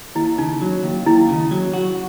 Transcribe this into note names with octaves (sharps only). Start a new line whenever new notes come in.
D#2 E4
C#3 D#4
F#3
D#2
D#2 E4
C#3
F#3
F#4